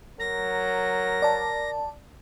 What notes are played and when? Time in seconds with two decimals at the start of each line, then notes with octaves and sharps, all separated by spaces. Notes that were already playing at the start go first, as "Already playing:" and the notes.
0.20 F#3 A#4 A#6
1.22 D5 A5